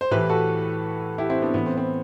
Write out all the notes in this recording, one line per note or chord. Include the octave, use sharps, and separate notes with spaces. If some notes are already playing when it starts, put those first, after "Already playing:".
C5
A2 E3 G4 B4
F#4 A4
E4 G4
C4 E4
B3 D4
A2 E3 B3
C4
C4